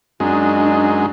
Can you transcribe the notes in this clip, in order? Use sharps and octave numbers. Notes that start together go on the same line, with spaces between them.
F#2 G#3 D4 D#4